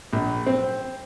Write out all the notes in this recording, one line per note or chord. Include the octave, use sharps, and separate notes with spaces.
A#1
C4